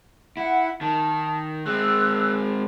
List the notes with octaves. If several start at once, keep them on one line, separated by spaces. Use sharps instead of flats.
E4 F#5
D#3 D#4 A5
G#3 C4 E6 F#6